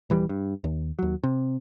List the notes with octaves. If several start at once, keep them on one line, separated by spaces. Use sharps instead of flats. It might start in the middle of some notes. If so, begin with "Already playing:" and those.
D#1 E3 F#3 G3
G2
D#2
D#2 F#3
C3